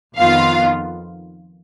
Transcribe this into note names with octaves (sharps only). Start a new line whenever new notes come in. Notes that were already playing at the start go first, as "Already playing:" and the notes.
F2 D#3 B3 F4 F5